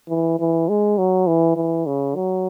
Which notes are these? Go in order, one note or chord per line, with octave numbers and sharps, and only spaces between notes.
E3
E3
G#3
F#3
E3
E3
C#3
F#3